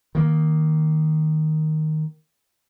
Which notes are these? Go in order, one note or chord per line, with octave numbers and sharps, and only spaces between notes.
D#3 A#3